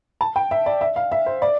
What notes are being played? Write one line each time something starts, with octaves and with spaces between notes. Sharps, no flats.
A5
G5
E5
D5
E5
F5
E5
C5
D5